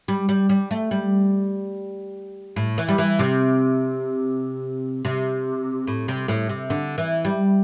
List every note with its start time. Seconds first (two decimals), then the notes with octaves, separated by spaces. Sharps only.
0.08 G3
0.29 G3
0.49 G3
0.71 A3
0.91 G3
2.56 A2
2.78 E3
2.88 G3
2.98 E3
3.19 C3
5.05 C3
5.87 A2
6.08 C3
6.28 A2
6.49 C3
6.70 D3
6.98 E3
7.25 G3